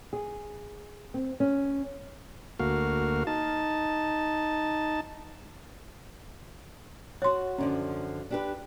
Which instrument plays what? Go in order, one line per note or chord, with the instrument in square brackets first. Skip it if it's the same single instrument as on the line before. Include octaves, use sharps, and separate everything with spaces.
[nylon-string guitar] G#4
C4
C#4
[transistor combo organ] D2 A#3 F#4 F5
D#4 A5
[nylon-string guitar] F#4 F#5 [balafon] C#5 C6
[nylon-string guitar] F#2 D3 F3 [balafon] C#4
[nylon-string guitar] D4 G4 B4